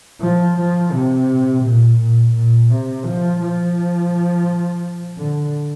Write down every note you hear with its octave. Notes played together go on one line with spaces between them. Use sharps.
F3
F3
C3
A#2
A#2
A#2
C3
F3
F3
D3